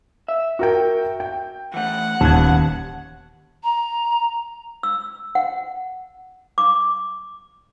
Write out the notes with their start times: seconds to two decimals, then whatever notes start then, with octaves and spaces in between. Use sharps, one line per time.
0.28 E5
0.59 F#4 A#4 G5
1.20 G5
1.74 E3 A3 F#5
2.21 D#1 D#2 B3 C#4 A5 G#6
3.64 A#5
4.83 E6
5.35 F#5
6.58 D6